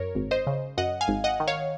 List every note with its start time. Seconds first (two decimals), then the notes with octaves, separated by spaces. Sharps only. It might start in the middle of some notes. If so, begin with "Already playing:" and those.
Already playing: F#2 A#4 C#5
0.15 G#1
0.31 C5 D#5
0.47 C#3
0.78 F#2 D#5 F#5
1.01 F5 G#5
1.08 G#1
1.24 D#5 F#5
1.40 D#3
1.48 C#5 F5